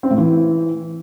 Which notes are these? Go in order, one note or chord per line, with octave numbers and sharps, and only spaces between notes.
C4
A2
E3